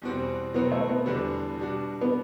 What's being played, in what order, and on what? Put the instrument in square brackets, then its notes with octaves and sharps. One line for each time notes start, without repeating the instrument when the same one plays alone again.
[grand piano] E2 B2 G3 C4 F#4
[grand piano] B2 F#3 C4 F#4 [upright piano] B3
[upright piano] A3
B3
[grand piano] E2 D3 G3 D4 F#4
B2 G3 D4 F#4
[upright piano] B3